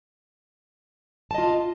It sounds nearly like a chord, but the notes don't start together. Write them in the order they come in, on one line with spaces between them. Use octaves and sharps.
A5 D#5 F4